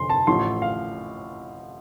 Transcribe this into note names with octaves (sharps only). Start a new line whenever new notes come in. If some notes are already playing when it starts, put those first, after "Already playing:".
Already playing: F1 F2 D3 C6
A5
A1 A2 F3 C6
F5